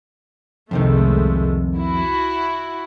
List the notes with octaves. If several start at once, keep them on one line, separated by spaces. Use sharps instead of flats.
C2 F2 C3 D#3 G#3 A3
E4 F#4